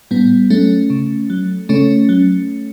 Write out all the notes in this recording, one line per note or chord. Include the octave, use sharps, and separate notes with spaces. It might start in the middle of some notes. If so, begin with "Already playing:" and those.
A2 G3 B3
F#3 A3 C#4
C#3
F#3
C#3 A3 C#4
F#3